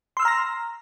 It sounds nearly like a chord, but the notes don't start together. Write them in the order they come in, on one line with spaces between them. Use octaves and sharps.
C6 E6 F6 A#5 A#6